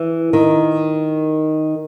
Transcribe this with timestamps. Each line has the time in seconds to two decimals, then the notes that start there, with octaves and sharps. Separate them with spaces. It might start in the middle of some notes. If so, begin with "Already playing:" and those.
Already playing: E3
0.33 D#3